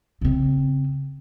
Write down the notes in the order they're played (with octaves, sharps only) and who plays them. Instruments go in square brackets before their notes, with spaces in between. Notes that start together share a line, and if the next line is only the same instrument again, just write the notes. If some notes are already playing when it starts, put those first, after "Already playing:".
[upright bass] C#3 C4